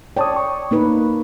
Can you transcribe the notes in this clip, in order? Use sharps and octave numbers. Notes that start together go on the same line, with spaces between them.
C#5 D5 G5 A5 D#6
C#6
A#3 D#4 B4